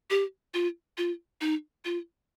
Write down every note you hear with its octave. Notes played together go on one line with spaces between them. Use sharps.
G4
F4
F4
D#4
F4